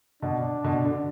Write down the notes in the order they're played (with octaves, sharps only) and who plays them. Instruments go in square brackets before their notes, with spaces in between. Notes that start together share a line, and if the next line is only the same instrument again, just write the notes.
[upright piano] B2 [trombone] D4
[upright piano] B2
D3